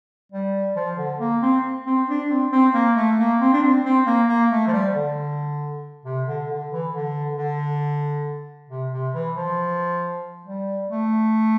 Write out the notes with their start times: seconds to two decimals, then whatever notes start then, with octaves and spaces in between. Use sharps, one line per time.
0.32 G3
0.76 F3
0.98 D3
1.20 A#3
1.42 C4
1.86 C4
2.08 D4
2.30 C4
2.52 C4
2.74 A#3
2.96 A3
3.18 A#3
3.41 C4
3.53 D4
3.63 C4
3.85 C4
4.07 A#3
4.29 A#3
4.50 A3
4.67 F3
4.73 G3
4.95 D3
6.05 C3
6.27 D3
6.49 D3
6.71 E3
6.93 D3
7.37 D3
8.70 C3
8.92 C3
9.15 E3
9.36 F3
10.46 G3
10.90 A3